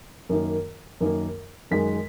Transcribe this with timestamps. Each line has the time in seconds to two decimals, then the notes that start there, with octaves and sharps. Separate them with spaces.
0.29 F#2 D#3 A#3
1.01 F#2 D#3 A#3
1.71 F#2 D#3 G#3 B6